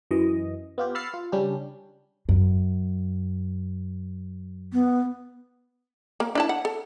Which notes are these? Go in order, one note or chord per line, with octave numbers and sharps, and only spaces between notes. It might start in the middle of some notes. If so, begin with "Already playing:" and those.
F#2 E3 D#5
B3 F4 G4
B5 E6 F6 A6 C7 C#7
F4
C#3 G3 C#4 D4 G4
F#2
B3
A#3
D4 E4 A5
F#5
A4